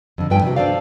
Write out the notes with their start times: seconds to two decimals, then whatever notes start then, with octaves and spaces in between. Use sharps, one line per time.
0.18 F2 D3
0.30 G2 F3 B4 G5 G#5
0.42 C3 F#4
0.56 A3 D4 B4 C5 D5 F5